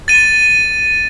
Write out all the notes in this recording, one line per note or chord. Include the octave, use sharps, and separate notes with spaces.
A6 D#7